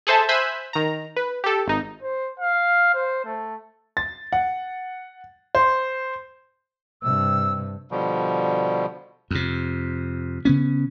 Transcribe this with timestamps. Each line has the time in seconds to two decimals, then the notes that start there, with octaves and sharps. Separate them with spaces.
0.07 G#4 A4 C5 E5 A5
0.29 C5 E5 G#5 B5 E6 F#6
0.73 D#3 A#5
1.16 B4
1.44 G4 A4
1.67 G#1 D#4
2.03 C5
2.40 F5
2.94 C5
3.25 A3
3.97 A6
4.32 F#5
5.55 C5
7.03 G2 C3 E6
7.91 B2 D3 F3 G3
9.31 F2 C3
10.45 C#3 B3 C#4